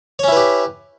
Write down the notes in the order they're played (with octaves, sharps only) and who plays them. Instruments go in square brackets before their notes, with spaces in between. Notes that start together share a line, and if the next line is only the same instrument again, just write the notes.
[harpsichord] C#5
C#4
E4
B4
G4